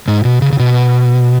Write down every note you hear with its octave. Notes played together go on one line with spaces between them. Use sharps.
G#2
B2
C#3
C#3
B2